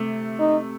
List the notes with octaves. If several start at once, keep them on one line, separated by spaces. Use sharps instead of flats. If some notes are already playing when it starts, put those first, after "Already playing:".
Already playing: C3 A3
D#4